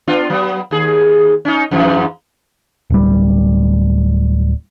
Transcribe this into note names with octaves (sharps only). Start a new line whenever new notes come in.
B3 D4 F4
F#3 B3
D#2 G#4
C#4 D#4
F2 G#2 E3
D1 G3